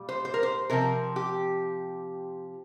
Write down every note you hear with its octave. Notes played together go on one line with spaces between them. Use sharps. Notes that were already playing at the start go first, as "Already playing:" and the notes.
Already playing: A#2 G3
C5
C5
A#4
C5
C3 F3 A#4
G4